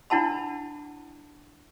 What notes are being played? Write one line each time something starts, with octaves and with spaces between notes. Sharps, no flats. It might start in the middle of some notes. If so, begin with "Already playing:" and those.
D4 E4 F#5 A5 B5